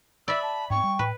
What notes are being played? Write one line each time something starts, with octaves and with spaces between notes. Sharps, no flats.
D5 E5 B5 E6
A5
G#2 B3 C4 G5 C#6
G3
A2 B4